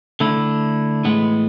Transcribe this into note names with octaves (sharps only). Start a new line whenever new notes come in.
D3 A3 E4
A2 E3 G#3 B3